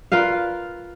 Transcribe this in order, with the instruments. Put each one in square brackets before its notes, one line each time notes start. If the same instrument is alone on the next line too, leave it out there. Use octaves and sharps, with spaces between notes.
[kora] F4 A#4 B4 F5